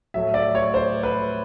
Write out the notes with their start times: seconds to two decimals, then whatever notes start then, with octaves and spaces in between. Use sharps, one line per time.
0.14 A2 F#3 A3 E5
0.34 D5
0.55 C#5
0.74 C5
1.03 B4